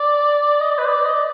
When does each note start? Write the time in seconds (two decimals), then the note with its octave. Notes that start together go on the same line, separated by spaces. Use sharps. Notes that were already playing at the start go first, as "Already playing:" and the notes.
Already playing: D5
0.61 D#5
0.69 D5
0.78 B4
0.88 D5
1.05 D#5
1.14 D5